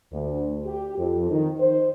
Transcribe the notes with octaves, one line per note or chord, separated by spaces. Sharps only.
D2
G4
F2
D#3
C5